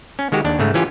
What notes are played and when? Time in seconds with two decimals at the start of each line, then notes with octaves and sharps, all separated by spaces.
0.19 C#4
0.32 D#3 G#3 F#4 G4
0.44 D#2 D4
0.59 G#2 C#3 A3
0.74 E3 C#4 F4 G4